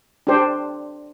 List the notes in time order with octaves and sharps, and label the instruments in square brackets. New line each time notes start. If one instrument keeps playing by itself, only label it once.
[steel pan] D4 G4 C5